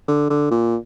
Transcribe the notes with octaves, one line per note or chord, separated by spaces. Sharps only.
D3
D3
A#2